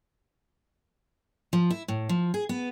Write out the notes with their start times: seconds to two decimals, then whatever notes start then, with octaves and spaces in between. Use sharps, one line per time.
1.53 F3
1.70 E4
1.88 A2
2.09 F3
2.34 G#4
2.49 B3